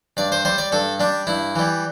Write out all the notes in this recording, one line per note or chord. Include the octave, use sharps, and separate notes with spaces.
G2 D5
C5
G3 C5
D5
G2 A4
G3 D4
G2 E4
E3 G3